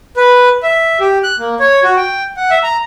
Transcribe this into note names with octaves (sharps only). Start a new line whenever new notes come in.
B4
E5
G4
F#6
A#3
C#5
F#4
G5
F#5
E5
A#5